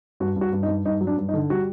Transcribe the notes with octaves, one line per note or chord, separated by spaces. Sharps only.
G2 F#4
G2
F#4
G2
D#4
G2
G2 D#4
F#3
D4
G2
D#4
D3
G3 F#4